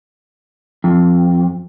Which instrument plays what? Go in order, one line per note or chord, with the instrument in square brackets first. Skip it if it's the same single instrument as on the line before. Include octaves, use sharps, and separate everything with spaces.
[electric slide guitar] F2